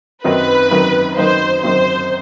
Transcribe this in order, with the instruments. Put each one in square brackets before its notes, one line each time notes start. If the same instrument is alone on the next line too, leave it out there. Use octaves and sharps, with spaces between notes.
[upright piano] F#2 D#3 F#3 C4 D#4 [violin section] B4
[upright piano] F#2 D#3 F#3 C4 D#4
[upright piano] F#2 D#3 F#3 C4 D#4 [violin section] C5
[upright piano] F#2 D#3 F#3 C4 D#4 [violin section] C5